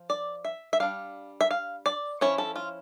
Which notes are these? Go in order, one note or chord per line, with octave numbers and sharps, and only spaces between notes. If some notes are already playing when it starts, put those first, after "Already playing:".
Already playing: F3
D5
E5
E5
G3 D4 F5
E5
F5
D5
F3 C#4 E4 C#5
A4
F4